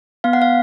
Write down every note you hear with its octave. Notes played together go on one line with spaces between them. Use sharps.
B3 F5
F#5
F5